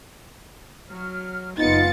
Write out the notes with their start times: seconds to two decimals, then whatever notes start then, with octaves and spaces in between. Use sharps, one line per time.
0.90 F#3 F6
1.58 F#1 G#3 B3 D#4 F4 A6 C#7